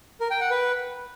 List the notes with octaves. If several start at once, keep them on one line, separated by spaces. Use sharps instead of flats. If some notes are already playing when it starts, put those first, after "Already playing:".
A#4
G5
F#5
B4